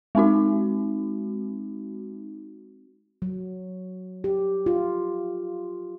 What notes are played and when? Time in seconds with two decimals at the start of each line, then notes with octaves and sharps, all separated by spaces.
0.15 G#3 C4 D#4 F#4
3.22 F#3
4.24 G4
4.66 F4